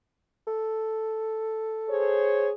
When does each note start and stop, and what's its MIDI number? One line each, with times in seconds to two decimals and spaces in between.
0.47 2.29 69
1.88 2.50 68
1.88 2.50 72
1.88 2.50 73